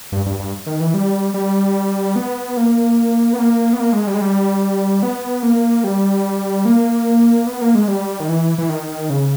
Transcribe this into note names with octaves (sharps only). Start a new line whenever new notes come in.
G2
G2
G2
D#3
E3
G3
G3
B3
A#3
B3
A#3
B3
A#3
G#3
G3
G#3
G3
B3
A#3
G3
A#3
B3
A#3
G#3
G3
D#3
E3
E3
D#3
C#3